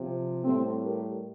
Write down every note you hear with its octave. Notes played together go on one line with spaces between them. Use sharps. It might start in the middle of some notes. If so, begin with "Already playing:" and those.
Already playing: C3 F3
A2 G3 A3 C4
G4 A#4